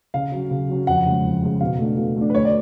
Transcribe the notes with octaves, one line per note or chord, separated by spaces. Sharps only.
C#3 F5
F#3 C#4
C#3
F#3 C#4
F2 F#5
C#3 G#3
F2
C#3 G#3
B2 F5
A3 D4
B2
A3 D4
B4
D2 C#5
D5